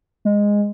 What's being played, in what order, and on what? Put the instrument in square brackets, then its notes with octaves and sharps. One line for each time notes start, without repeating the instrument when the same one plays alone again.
[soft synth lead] G#3